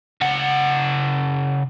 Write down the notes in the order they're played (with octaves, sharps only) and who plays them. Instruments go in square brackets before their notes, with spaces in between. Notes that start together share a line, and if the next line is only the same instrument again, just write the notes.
[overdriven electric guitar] C#3 F#5